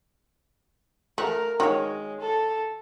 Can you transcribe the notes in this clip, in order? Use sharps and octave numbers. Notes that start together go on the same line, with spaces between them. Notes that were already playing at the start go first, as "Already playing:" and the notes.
A3 A#4 F#5
D#3 G#3 F#4 C#5
A4